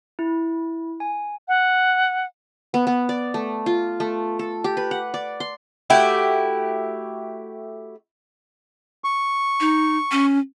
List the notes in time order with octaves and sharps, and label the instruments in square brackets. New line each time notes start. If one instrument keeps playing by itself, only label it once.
[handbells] E4
G#5
[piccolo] F#5
[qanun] B3
B3
D5
A3
F4
A3
A4
G4
B4
F#5
D5
C6
[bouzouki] A3 E4 F#4 G4
[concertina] C#6
[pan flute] D#4
C#4